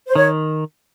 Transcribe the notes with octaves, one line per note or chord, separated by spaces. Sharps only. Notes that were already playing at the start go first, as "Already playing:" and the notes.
C5
D#3 C#5